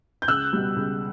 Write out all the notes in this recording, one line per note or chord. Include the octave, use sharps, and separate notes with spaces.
G6
C#2 E6 F#6
B2 G3
C#2